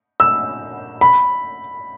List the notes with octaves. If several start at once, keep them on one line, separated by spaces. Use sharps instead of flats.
E6
B5